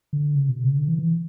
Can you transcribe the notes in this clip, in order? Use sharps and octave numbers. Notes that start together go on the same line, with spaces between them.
D3
C#3
B2
C#3
D3
E3
E3